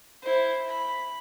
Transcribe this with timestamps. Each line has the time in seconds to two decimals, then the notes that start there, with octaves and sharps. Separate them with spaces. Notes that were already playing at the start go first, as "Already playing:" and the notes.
0.22 E4 C5
0.67 B5